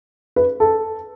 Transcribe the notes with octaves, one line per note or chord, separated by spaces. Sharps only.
B4
A4